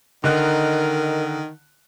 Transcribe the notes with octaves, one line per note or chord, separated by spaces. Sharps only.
D3 D#3 D#4 A#4 F#6